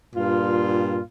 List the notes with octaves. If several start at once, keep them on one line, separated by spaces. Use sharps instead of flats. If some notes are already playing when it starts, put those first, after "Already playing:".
G2 A#2 F4